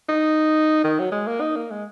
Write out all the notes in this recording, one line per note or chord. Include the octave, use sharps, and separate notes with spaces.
D#4
D#3
F#3
G#3
A#3
D#4
A#3
G#3